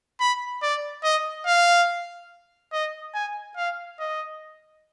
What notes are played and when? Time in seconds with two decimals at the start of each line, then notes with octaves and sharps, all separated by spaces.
0.20 B5
0.63 D5
1.04 D#5
1.47 F5
2.73 D#5
3.14 G#5
3.57 F5
4.00 D#5